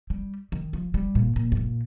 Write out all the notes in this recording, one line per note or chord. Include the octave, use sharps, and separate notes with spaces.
G3
D#3
F3
G3
A#2
A#2
G2
A#2